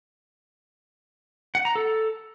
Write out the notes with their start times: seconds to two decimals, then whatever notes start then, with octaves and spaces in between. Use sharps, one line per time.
1.55 F#5
1.65 A#5
1.75 A4